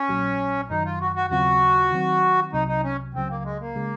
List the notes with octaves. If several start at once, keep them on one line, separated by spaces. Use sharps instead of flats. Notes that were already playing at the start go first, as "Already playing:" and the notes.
Already playing: C#4
A#1 A#2 F#3
F#2 D#3 F#3 D#4
F4
F#4
F#4
D#2 C#3 F#3 C4 F4 F#4
D#3 F#3 C4
C2 C3 F#3 D#4
D#4
C#4
C#2 C#3 F#3 C4
A#3
G#3
A#3
C#3 G#3